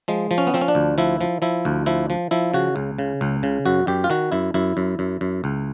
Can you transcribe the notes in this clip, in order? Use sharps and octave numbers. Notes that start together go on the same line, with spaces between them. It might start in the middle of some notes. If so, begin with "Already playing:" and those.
F3 G#3
F3
C#4
B3
F3 C4
C#4
D4
D2
F3 E4
F3
F3 E4
D2
F3 E4
F3
F3 E4
C#3 F#4
C#2
C#3
C#2
C#3
F#2 F#4
F#2 G4
F4
D#3 F#4
F#2 E4
F#2 E4
F#2
F#2
F#2
C#2